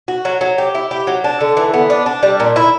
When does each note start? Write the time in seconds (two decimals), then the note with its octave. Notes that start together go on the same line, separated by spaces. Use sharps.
0.08 F#4
0.25 F#3
0.41 F#3
0.58 G4
0.75 E4
0.91 G4
1.07 F#3
1.24 D4
1.41 D3
1.57 E3
1.73 B3
1.90 D4
2.06 D4
2.23 G3
2.40 A#2
2.56 E4